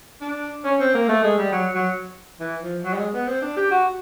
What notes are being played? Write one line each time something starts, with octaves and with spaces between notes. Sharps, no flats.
D4
C#4
C4
A#3
A3
G#3
G3
F#3
F#3
E3
F3
F#3
G3
G#3
B3
C4
D4
G4
F#4